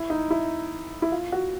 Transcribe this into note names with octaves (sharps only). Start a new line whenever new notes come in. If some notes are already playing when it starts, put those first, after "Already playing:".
Already playing: E4
D#4
E4
E4
F4
F#4